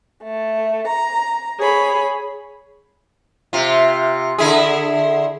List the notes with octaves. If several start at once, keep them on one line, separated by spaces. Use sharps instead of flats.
A3
A#5
G#4 C#5 B5
C3 F4
D3 E4 G#4